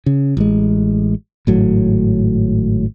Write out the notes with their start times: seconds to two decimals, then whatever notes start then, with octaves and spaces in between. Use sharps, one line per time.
0.06 C#3
0.37 A1 G#3
1.47 G#1 A2 F#3